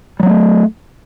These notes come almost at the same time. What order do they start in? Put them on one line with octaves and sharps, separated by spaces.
G3 F#3 B3 A3